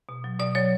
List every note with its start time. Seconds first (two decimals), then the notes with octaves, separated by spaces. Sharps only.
0.09 B2
0.24 F#3
0.39 B2 D5
0.55 F#3 C#5